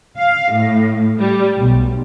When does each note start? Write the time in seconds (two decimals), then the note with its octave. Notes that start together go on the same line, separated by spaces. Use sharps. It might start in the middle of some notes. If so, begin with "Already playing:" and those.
0.18 F5
0.53 A2
1.20 G3
1.57 B1